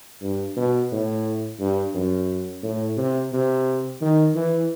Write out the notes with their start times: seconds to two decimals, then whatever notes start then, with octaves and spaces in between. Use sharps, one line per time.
0.22 G2
0.57 B2
0.92 A2
1.60 G2
1.95 F#2
2.63 A2
2.97 C3
3.33 C3
4.01 D#3
4.35 E3